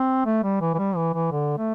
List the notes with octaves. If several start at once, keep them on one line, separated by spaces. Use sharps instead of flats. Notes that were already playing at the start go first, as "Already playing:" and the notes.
Already playing: C4
A3
G3
E3
E3
G3
E3
E3
D3
A3